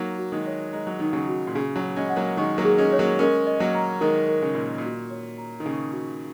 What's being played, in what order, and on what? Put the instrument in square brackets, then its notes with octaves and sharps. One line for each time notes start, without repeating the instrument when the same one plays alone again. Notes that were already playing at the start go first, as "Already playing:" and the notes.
Already playing: [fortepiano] F#3 A#3 [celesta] D#4
[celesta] F#4
[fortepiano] D#3 G#3
[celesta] C#5
[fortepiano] G#3 [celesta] A#5
[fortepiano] F#3
[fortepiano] D#3 [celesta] D#4
[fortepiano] C#3 F#3
[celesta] F#4
[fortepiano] A#2
[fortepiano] C#3 [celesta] G#4
[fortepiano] C#3 F#3
[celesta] C#5
[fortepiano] G#3 C#4
[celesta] F#5
[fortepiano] F#3 A#3
[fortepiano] D#3 G#3 [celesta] C#6
[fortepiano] F#3 A#3
[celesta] G#4
[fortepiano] G#3 C#4
[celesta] C#5
[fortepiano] F#3 A#3
[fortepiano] G#3 C#4 [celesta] A#4
[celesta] D#5
[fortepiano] F#3 A#3
[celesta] A#5
[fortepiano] D#3 G#3 [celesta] A#4
[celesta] A#4
[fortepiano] C#3
[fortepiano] A#2 [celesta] D#5
[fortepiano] A#2
[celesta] F#4
C#5
A#5
[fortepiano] D#3
[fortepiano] C#3 [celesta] C#6
[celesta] F#4